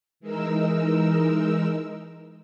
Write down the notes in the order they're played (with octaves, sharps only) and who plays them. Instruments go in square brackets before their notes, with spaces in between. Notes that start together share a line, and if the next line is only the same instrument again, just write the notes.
[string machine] E3 G#3 D#4 A#4 E6